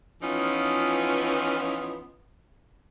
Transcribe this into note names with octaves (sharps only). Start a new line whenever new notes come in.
E3 F3 B3 C#4 D#4 F4